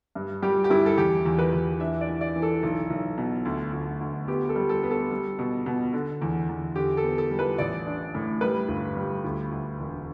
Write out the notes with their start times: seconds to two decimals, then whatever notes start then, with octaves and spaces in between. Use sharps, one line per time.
0.15 G2
0.42 G3 G4
0.64 G4
0.70 G2 E4
0.86 A4
0.98 E2 G4
1.26 E2
1.38 B4
1.53 E2
1.80 D4 E5
2.01 D5
2.08 E3
2.21 D5
2.36 E3
2.42 A4
2.63 B1
2.90 B1
3.18 B2
3.45 D2
3.73 D2
4.00 D2
4.28 B3 G4
4.49 A4
4.56 G3
4.69 A4
4.83 B3
4.91 A4
5.11 G3
5.39 B2
5.66 B2
5.93 D3
6.22 E2
6.49 E2
6.76 D3 G4
6.97 A4
7.04 B3
7.18 A4
7.31 G3
7.39 B4
7.58 A1 D5
7.87 D4
8.14 A2
8.41 G3 B4
8.68 G1
8.97 G3
9.24 D2
9.51 D2
9.79 E1